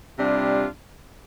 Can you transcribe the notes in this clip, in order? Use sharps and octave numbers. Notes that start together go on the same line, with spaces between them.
C3 G3 D4 F4